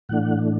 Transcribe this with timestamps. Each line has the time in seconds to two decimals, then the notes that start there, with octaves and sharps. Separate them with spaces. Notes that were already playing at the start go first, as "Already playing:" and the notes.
0.09 A2 E3 A3 D4 F#5